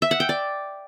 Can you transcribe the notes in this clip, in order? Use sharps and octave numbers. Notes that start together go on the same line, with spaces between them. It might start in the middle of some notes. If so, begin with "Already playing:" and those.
E5
F#5
G5
D5